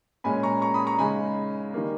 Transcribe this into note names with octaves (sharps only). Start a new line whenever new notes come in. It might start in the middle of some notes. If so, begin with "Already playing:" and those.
A#2 G#3 C#4 G#5 B5
A#5 C#6
A#5 C#6
B5 D#6
A#5 C#6
C#3 G#3 D#4 G#5 B5
D#3 G3 A#3